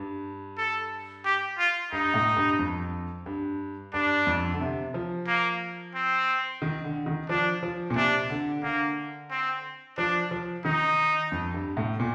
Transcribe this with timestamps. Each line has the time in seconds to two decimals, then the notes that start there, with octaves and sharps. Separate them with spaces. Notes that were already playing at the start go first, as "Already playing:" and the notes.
Already playing: G2
0.58 A4
1.25 G4
1.58 F4
1.92 G2 D#4
2.14 A2
2.37 G2
2.59 F2
3.26 G2
3.93 G2 D4
4.27 F2
4.54 D3
4.61 C3
4.94 F3
5.27 A#3
5.95 C4
6.62 D#3
6.84 D3
7.06 D#3
7.29 F3 D4
7.63 F3
7.90 A#2
7.96 C3 D4
8.30 D3
8.63 D3 A#3
9.30 C4
9.98 F3 D4
10.31 F3
10.65 D#3 D#4
11.32 F2
11.54 G2
11.77 A2
12.00 A#2